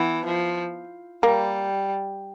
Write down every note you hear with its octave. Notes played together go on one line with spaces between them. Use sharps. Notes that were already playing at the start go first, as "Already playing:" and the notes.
Already playing: E3 B3
F3
G3 A#3